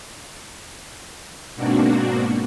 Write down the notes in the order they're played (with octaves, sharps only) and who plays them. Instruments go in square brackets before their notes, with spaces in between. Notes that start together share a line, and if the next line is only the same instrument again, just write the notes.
[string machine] G#2 B2 A#3 C4 D4 F#4